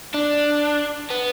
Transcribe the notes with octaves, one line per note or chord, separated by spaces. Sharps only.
D4
B3